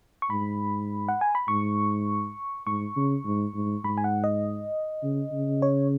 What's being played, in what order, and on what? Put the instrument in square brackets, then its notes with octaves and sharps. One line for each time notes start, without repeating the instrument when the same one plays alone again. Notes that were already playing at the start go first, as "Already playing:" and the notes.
[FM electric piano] C#6
[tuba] G#2 [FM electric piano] B5
[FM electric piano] F#5
G#5
B5
[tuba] G#2 [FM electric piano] C#6
[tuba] G#2 [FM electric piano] C#6
[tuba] C#3
G#2
G#2
[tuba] G#2 [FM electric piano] B5
[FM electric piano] G#5
F#5
D#5
[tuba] C#3
C#3
[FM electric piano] C#5